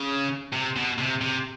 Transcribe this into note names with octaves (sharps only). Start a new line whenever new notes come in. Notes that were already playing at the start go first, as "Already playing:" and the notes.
Already playing: C#3
C3
B2
C3
C3